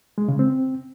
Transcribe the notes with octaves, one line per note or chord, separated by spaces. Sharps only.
G#3
C#3
C4